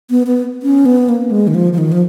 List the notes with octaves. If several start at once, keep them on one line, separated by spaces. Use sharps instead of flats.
B3
B3
C#4
B3
A#3
G#3
D#3
F3
F3
D#3
F3